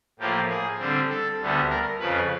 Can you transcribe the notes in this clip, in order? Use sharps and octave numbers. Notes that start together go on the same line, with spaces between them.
A2 F3 A#3 G4
G#4
D3 G3 C4
A4
D2 D3 G3 B3
A#4
F2 C#3 F3 B4